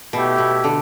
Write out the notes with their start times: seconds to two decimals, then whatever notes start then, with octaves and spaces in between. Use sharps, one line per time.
0.13 B2 A3 E4 G4
0.38 B2
0.64 D3